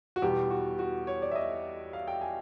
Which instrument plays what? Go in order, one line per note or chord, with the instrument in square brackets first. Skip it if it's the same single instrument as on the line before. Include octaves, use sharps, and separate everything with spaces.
[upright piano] F#4
E2 B2 G3 B3 G4
F#4
F#4
C#5
D5
E5
D#5
F5
G5
G#5